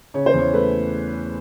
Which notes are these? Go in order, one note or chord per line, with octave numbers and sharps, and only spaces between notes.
C#3 C#5
C5
E2
C#5
A3 B4